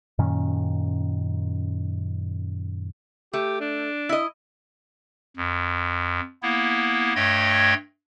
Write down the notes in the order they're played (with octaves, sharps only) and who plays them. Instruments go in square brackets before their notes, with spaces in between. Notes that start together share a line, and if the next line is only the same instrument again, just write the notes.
[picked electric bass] F#2 A#2 D#3 C#4
[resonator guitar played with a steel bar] A3 [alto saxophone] G4
[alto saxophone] D4
[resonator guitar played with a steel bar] E4 D#5
[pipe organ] F2
A#3 B3 E4
G2 A3 C#5 D#5 G5 G#6